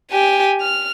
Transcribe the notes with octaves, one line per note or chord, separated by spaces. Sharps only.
G4 G#5
F6